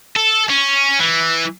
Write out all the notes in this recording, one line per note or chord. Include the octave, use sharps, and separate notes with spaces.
A4
C#4
E3